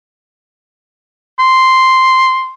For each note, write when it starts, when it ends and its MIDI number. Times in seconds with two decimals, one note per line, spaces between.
1.39 2.53 84